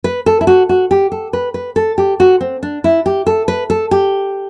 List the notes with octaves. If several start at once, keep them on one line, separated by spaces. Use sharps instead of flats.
B4
A4
E4
F#4
F#4
G4
A4
B4
B4
A4
G4
F#4
C4
D4
E4
G4
A4
B4
A4
G4